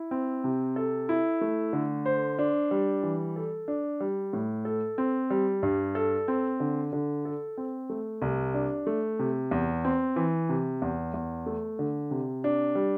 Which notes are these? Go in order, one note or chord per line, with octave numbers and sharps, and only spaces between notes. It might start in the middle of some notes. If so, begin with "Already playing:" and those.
Already playing: E4
C4
C3
A4
E4
A3
D3
C5
D4
G3
E3
A4
D4
G3
A2
A4
C4
G3
G2
A4
C4
D3
D3
A4
C4
A3
C2
D4
A3
C3
E2
C4
E3
C3
E2
E2
A3
D3
C3
D4
G3